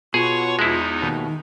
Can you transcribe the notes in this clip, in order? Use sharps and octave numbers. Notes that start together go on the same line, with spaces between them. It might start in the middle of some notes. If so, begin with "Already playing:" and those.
B2 F4 G#4 C#5 F#5 C#6
E2 G#3 B3 D#4 E4
D#2 G#2 B2 D#3